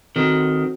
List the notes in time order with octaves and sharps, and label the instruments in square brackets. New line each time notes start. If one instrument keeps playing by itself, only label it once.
[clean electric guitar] D#3 [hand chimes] C4 F#4 A4 C5